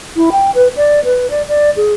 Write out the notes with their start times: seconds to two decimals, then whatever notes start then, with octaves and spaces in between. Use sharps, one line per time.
0.16 E4
0.32 G5
0.55 B4
0.77 D5
1.05 B4
1.30 D5
1.48 D5
1.77 G#4